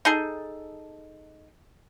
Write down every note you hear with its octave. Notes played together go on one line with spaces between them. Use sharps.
D#4 G#4 A4